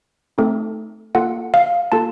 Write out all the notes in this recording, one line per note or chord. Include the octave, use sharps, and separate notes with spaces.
A3 C4 D#4 A4
A#3 F4 A4 F#5
F5
A#3 F4 A4 A5